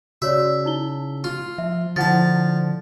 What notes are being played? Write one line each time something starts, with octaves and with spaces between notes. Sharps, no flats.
C#3 F#4 C#5 D5 E5
D#4 E4 G7
F4
F3 E5
D3 F3 E4 F#5 A5 A6